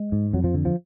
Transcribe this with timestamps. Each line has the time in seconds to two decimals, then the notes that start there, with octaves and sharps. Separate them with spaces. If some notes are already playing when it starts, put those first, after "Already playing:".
Already playing: G#3
0.12 G#2
0.33 F2 F#3
0.44 F3
0.54 D3
0.65 F3